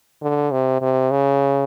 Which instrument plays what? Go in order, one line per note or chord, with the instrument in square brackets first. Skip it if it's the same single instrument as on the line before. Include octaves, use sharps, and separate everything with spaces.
[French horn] D3
C3
C3
C#3